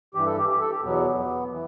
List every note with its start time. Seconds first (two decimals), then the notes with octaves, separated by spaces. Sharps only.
0.14 G2 E3 G4
0.26 A4
0.38 G4
0.49 G4
0.60 A4
0.71 G4
0.82 E2 B2 F#3 B3
1.52 E3